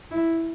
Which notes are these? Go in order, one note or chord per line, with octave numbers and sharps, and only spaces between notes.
E4